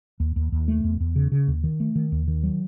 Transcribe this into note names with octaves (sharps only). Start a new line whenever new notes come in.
D#2
D#2
D#2
A3
E2
E2
C#3
C#3
D#2
D#3
A3
D#3
D#2
D#3
F#3